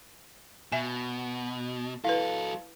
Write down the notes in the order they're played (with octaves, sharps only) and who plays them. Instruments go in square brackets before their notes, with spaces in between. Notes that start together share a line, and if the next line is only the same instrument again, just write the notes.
[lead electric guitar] B2 [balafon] E5 G#5
[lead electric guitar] F#3 A4 [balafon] E4 B4 [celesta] F5